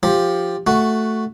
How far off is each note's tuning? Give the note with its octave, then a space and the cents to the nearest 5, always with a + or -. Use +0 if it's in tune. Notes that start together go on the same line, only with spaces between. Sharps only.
F3 +10 G4 +10
A3 +0 F#4 +0